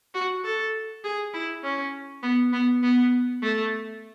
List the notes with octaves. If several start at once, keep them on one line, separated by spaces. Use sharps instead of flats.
F#4
A4
G#4
E4
C#4
B3
B3
B3
A3